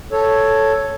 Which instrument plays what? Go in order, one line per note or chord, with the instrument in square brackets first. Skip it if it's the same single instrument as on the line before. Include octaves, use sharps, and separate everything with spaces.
[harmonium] A4 C#5